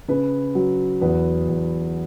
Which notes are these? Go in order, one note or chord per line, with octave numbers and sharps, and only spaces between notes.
C#3 B4
F#3
E2 B4
E2